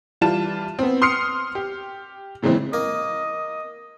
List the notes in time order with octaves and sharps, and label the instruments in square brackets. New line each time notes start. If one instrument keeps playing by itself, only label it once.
[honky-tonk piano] E3 G3 F4 A5 E7
B3 C4
C6 D#6 F6 C7 C#7
G4
A#2 C#3 E3 G#3 C4
[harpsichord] A#3 [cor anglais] D#5